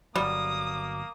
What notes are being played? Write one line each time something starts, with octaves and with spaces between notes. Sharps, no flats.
G1 F#3 G3 A#3 D#6